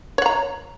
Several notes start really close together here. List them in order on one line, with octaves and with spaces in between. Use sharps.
C#5 F#5 A#5